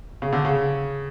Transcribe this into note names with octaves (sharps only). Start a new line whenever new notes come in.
C#3
D3
C#3